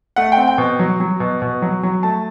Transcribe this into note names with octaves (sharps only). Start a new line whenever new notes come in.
A3 F#5
G5
C4
G5
B2
F#3
F#3
B2
B2
F#3
F#3
A3 A5